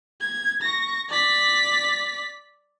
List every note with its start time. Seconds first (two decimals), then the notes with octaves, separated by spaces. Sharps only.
0.20 G#6
0.62 C#6 A#6
1.09 D5 B6